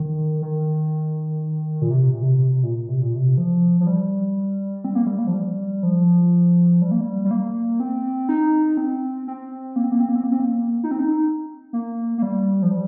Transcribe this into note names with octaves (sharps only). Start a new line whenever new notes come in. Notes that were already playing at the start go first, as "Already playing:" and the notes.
Already playing: D#3
D#3
A#2
C3
A#2
C3
C3
A#2
C3
A#2
C3
F3
F3
G3
C4
A#3
G3
A#3
F3
G3
F3
G3
A#3
G3
G3
A#3
C4
D#4
C4
C4
A#3
C4
A#3
C4
A#3
C4
A#3
C4
A#3
D#4
C4
D#4
A#3
A#3
G3
F3
G3